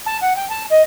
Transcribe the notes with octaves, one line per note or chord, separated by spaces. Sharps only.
A5
F#5
G5
A5
D#5